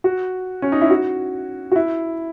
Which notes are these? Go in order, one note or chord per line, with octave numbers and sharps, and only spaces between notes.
F#4
C#4
D#4
E4
F#4
F#4
E4